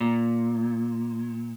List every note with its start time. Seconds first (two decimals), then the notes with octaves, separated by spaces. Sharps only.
0.01 A#2